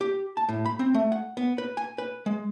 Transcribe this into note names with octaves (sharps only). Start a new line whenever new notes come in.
G4
A5
A2
B5
C4
A3
F#5
B3
B4
G#5
B4
G#3